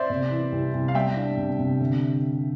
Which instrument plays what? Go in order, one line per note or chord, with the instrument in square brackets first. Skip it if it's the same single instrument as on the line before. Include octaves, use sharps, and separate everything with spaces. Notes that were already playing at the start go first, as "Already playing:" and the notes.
Already playing: [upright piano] C5 D5 E5
[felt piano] C3
E3
C2
C2
[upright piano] F5
[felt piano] G3 [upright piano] E5 G5
[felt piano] D4
C3
C3
D3